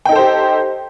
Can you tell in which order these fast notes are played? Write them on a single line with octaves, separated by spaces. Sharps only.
G5 D#4 A4 C5 G4